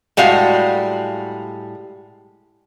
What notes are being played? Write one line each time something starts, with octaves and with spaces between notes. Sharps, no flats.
A2 G3 G#3 F#4 F5